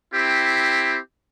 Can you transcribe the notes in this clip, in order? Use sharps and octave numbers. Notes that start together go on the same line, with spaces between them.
C4 E4 G4